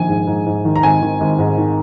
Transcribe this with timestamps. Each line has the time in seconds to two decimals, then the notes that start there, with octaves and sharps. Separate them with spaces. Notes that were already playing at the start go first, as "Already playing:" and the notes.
Already playing: A#1 D#3 G#5
0.08 G#2
0.27 G#2
0.46 G#2
0.65 D#3
0.76 A#5
0.83 G#1 G#5
1.02 D#3
1.21 G#1
1.39 G#2
1.58 D#3